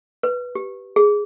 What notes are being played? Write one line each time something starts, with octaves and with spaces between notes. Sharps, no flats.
B4
G4
G#4